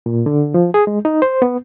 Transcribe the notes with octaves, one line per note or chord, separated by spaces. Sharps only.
A#2
D3
F3
G#4
G#3
D#4
C5
B3